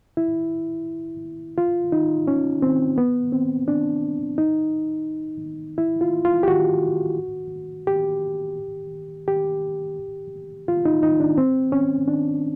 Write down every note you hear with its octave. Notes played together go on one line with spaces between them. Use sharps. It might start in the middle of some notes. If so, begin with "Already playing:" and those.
E4
F4
D#4
C#4
C4
B3
C4
D4
D#4
E4
F4
F4
G4
F#4
G4
G4
F4
D#4
D#4
D4
C4
C#4
D4